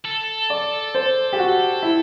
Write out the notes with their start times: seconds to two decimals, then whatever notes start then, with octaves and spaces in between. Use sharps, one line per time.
0.05 A4
0.50 D5
0.95 C5
1.33 G4
1.38 F#4
1.83 E4